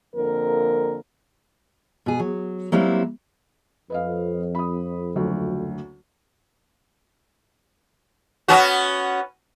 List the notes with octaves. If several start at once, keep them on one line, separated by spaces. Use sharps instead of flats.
F2 D3 A#3 A#4
B2 G#4
F#3
F#3 G3 A#3 C4 E4
F2 B4 D#5 F5
B5 D#6
F#1 D2 F#3
B3 C#4 F#4